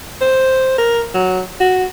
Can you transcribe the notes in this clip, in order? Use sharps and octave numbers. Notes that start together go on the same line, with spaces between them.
C5
A#4
F#3
F#4